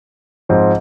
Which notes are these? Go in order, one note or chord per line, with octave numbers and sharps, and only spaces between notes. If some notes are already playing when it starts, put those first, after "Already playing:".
G#2 F3 C4